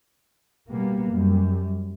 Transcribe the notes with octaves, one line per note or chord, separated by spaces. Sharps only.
B2 G3 A#3 B3
F#2 G3